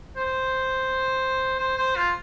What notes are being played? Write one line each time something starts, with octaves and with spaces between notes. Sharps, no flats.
C5
C5
C5
F4